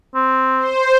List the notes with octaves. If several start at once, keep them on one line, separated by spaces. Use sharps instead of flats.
C4
C5